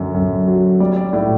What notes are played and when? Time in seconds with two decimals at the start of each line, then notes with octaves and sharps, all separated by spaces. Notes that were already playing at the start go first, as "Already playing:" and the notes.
Already playing: F#2 D3
0.14 F#2
0.47 F#3
0.80 G3 D5
0.96 D5
1.13 A2 D5